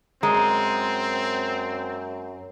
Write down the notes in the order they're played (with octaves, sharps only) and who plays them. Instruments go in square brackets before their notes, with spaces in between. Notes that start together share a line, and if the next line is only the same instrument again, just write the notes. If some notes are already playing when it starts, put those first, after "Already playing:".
[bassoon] F#2 [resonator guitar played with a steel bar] G#3 [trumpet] C4 [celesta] A#5